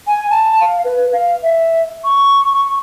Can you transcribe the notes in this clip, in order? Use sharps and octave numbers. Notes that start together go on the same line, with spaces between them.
G#5
A5
F5
B4
F5
E5
C#6
C#6